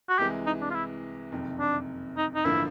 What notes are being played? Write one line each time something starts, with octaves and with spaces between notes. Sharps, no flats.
F#4
C2 C3 E3 G#3 G4
D#4
D4
F4
E4
F#1 F2 C3 D#3
D4
D#4
D#4
A1 G2 D3 F3 A#3 E4